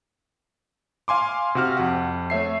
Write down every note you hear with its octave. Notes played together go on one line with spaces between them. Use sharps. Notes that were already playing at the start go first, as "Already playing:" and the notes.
F5 G#5 C6 D6
C3 F#4 F6
F2 F#5
A3 C#5 E5 C7